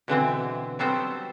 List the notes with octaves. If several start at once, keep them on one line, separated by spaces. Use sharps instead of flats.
B2 D3 E3 C4
F#3 G3 B3 C4 A4 C5